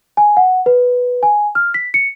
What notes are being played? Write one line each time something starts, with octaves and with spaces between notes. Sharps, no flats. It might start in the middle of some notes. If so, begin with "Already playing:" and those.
G#5
F#5
B4
G#5
F6
B6
C#7